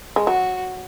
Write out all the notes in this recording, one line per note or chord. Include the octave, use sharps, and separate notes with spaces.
G#3
F#3 F#4